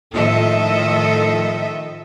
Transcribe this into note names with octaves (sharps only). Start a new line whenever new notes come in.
A2 D#3 F3 A4 D#5 E5